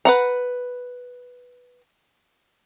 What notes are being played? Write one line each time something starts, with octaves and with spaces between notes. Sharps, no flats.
B4 F#5 A#5